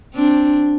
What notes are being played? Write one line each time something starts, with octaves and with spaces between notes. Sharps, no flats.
C4 D4